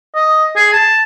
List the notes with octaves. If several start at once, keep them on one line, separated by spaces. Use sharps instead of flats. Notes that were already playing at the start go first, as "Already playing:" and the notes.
D#5
G#4
A5